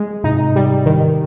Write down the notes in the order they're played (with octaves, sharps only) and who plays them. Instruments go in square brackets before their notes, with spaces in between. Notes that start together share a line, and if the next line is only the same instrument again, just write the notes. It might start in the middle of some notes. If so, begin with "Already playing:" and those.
Already playing: [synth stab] G#3
[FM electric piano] G#2 C3 [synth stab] D#4
[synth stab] G3
D#3